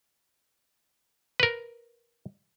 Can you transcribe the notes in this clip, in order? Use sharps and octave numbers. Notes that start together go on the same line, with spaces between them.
A#4 B4